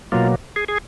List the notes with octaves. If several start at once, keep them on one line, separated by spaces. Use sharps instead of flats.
B2 F#3 A#3 F4
G#4
G#4